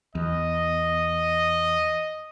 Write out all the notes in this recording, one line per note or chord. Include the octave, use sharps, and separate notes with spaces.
E2 D#5